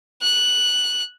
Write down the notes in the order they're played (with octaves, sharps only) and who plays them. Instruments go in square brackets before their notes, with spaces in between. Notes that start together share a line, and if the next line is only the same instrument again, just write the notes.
[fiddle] F#6